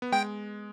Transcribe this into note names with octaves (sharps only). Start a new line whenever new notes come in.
B3
G#3 G5